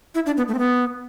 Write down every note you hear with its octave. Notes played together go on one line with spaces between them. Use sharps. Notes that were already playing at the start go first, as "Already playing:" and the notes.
E4
D4
B3
A3
C4
B3